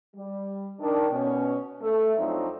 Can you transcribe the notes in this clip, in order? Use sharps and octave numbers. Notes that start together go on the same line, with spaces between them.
G3
D#3 D4
B2 C#4
A3
F2 F3 F#3 C4 D4 D#4